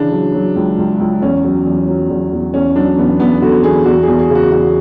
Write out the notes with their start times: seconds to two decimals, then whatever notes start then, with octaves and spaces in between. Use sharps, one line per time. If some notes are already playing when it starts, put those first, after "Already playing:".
Already playing: C#3 E3 D4
0.12 F#3
0.34 F#3
0.56 C#2
0.78 C#2
1.00 C#2
1.22 E2 C#4
1.44 F#3
1.66 E2
1.88 F#3
2.10 E2
2.32 E2
2.54 E2 C#4
2.76 F#3 D4
2.98 E2 B3
3.20 E2 B3
3.42 D3 F#4
3.64 E2 G#4
3.86 E2 F#4
4.03 E2 G#4
4.19 G#4
4.30 C#3
4.35 F#4
4.52 E2 F#4